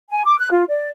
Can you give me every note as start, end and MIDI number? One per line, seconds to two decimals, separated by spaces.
0.10 0.23 80
0.25 0.36 86
0.39 0.49 90
0.51 0.64 65
0.69 0.89 74